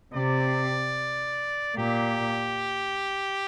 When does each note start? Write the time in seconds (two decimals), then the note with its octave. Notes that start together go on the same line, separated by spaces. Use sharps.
0.13 C3 D5
1.77 A#2 G4